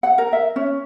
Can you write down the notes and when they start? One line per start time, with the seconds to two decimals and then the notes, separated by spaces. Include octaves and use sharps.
0.03 F#5
0.18 A#4
0.33 E5
0.56 C#4